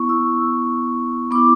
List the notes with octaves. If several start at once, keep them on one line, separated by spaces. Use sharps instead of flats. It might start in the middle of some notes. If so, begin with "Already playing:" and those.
Already playing: B3 E4 C#6
E6
B3 E4 D6